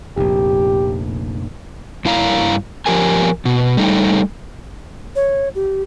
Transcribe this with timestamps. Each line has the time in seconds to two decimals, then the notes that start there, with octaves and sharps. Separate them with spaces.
0.17 F1 A#1 G4
2.05 G2 E4 F5 A#5
2.86 F3 G4 A#4 G#5
3.45 B2
3.77 G3 A3 D#4
5.16 C#5
5.55 G4